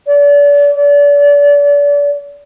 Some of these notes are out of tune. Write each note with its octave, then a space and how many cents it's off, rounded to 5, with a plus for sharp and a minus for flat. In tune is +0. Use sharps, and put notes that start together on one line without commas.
D5 -35
D5 -35